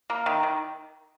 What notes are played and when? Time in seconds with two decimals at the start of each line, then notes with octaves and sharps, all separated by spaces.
0.10 A#3
0.26 D#3
0.43 D#3